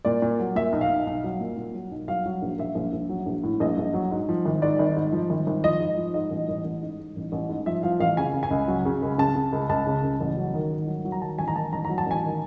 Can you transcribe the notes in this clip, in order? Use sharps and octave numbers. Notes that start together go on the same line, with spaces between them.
A#2 D5
A#2
F#3
A#2 E5
B1
F5
B1
B1
F#3
A#2
A#2
F#3
B1
F#3 F5
F#3
A#1
A#1 E5
A#1
A#1
F#3
A#1
A2
A#1 D#5
A#1
F#3
G#2
F3
G#1
G#2 D5
G#1
G#2
F3
G#1
G#1
F3 D#5
G#2
F3
G#2 D#5
A1
A1
A1
G#2
G#2
A1
A1
G#2
F3 E5
F3 F5
A1 F5
C#3 G#5
C#3
G#5
C#2
F#3
C#3
C#2
C#3 A5
C#3
C#2
C#2 A5
C#3
C#2
A1
F#3
D#3
G#2
F#3
F#3
A#5
D#3 A5
A1 G#5
A#5
D#3 A5
A1 A#5
A#5
F#3
A5
A1 G#5
D#3